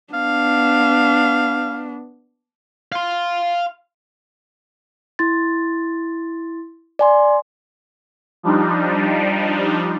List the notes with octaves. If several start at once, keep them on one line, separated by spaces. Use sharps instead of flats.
B3 D4 F5
F5 C6
E4 C6 A6
D5 G#5 C6
F3 G3 D4 D#4